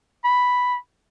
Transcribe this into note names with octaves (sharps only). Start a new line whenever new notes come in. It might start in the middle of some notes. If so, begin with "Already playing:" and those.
B5